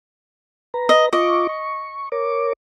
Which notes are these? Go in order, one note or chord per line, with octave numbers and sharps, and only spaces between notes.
B4 A#5
D#5
F4 D#5 C#6 D6
C#6
A#4 C#5 D6